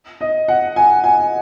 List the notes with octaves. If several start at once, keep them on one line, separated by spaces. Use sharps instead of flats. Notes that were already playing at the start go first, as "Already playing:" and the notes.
D#5
F#5
G#5
G#5